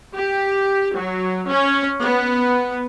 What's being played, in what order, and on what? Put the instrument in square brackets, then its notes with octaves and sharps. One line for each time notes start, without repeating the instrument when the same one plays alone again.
[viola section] G4
F#3
C#4
B3